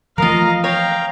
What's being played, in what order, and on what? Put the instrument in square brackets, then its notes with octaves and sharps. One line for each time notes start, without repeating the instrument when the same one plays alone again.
[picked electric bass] E3 F3 A3 [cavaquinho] F4 A#4 [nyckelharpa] D#5 F5 [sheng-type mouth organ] A#5
[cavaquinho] C#5 [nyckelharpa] F5 [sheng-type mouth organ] G5 A#5